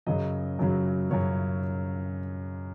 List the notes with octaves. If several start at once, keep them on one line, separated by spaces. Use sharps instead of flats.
F#2 C#3 F#3 D#5
F#2 C#3 F#3
F#2 C#3 F#3 C#5